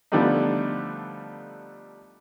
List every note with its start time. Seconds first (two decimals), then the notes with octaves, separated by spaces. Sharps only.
0.12 D3 F3 G3 A3 B3 D#4